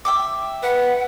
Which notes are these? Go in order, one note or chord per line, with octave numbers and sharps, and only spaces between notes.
E5 G5 D6
B4 F#5